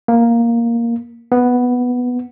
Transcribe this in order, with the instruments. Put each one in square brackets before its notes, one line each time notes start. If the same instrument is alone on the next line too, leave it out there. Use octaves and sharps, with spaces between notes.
[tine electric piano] A#3
B3